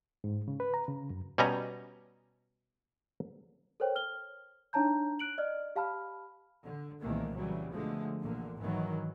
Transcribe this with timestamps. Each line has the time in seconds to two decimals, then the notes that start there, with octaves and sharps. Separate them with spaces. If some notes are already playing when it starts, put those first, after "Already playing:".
0.24 G#2
0.48 C#3
0.60 B4
0.74 A#5
0.88 C#3
1.10 F#2
1.38 B2 G3 C#4 D#5 G#5 A#5
3.80 A4 A#4 C5 C#5 G5
3.96 F6 G7
4.73 D4 D#4 C#5 A5 A#5 G6
5.19 F#6 D7 F#7
5.38 D5 D#5 F6
5.76 G4 F5 A5 B5 F6
6.63 D3
7.02 C2 A#2 D#3 E3 A3 A#3
7.35 C#3 E3 F#3 G3
7.73 B2 D3 F3 G#3 A3
8.22 A#1 E2 A#2 D3 A#3
8.59 G#2 D#3 E3 F#3